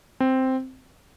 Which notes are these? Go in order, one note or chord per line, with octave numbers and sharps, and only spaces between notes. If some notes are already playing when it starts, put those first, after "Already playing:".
C4